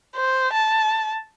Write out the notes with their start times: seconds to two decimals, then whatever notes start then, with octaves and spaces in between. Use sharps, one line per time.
0.16 C5
0.53 A5